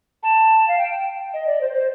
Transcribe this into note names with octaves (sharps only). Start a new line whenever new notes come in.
A5
F5
G5
D#5
D5
C5
C5